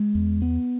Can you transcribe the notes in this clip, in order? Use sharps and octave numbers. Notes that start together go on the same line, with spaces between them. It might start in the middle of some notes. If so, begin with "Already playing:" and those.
Already playing: G#3
E2
B3